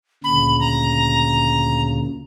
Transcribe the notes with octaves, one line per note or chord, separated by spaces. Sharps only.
D2 A#2 C#3 B5
A#5